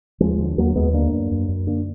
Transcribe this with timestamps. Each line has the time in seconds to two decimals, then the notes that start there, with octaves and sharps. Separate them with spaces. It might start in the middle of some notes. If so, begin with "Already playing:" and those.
0.20 D#2 F3 G#3
0.39 D3
0.57 D#2 F#3 A#3
0.76 D#2 G#3 B3
0.93 D3 A#3 D4
1.12 F#2
1.31 F#2
1.49 F#2
1.67 D3 A#3 D4